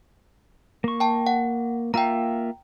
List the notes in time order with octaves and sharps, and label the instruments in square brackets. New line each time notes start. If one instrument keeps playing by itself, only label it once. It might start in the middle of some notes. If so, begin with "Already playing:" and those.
[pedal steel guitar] A#3 C#6
[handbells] G5 A5
F#5
[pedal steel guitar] A#3 F4 E5 [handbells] G5 A#5